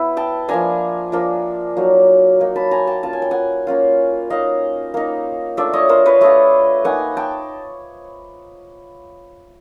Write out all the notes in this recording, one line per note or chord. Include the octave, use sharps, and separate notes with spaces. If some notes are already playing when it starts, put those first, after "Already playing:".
Already playing: B3 E4 E5
G5 A5
F3 A#3 D4 G#5 A#5
F3 A#3 D4
F#3 A#3 D#4
F#3 A#3 D#4
A5 B5
G#5 A#5
G5 A5
A#3 C#4 F4 A5
G#5
G5
F#5 G#5
A#3 C#4 F4
A#3 D#4 D#5 F5
A#3 D#4
A3 D4 F4 D5 E5
C#5 D#5
A#4 C5
B4 C#5
A3 D4 F4 C#5 D#5
A#3 D#4 F#5 G#5
G5 A5